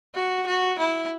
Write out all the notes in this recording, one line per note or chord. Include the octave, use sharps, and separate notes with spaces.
F#4
F#4
E4